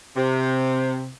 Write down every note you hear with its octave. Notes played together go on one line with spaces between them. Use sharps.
C3